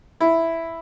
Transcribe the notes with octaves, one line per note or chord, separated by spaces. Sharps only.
E4